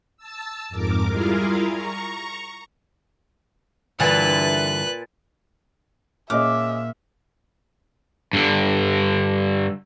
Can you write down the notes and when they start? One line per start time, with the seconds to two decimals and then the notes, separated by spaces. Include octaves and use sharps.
0.17 A5 E6
0.69 F2 G#2 A#4 D6
1.08 G3 E4 F4 G#4 A#4 F5
1.71 A#5 C#6
4.00 G2 A#2 D3 E3 B4 A5 F#6
6.30 A#2 C#4 G#4 D#5 E5 D6 F6
8.33 G2 D3